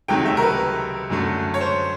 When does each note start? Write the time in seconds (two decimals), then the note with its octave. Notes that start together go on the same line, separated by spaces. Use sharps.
0.08 C#2 C3 D#3 F#3 A3 G5
0.26 E5
0.37 A#4
0.42 B4
1.10 F#2 D3 F#3 A3
1.54 C#5
1.61 C5